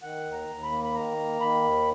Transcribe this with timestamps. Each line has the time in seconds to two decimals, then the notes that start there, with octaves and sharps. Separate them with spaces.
0.02 D#3 F#5
0.25 D#2
0.33 A#5
0.48 D#2
0.63 B5
0.71 A#3
0.84 B5
0.95 D#3 A#5
1.17 A#3
1.41 D#3 B5
1.63 D#2